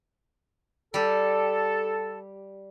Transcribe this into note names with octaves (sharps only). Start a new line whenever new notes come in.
G3 G4 A4